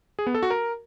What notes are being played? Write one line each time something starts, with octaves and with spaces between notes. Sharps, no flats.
G#4
B3
A4
F#4
A#4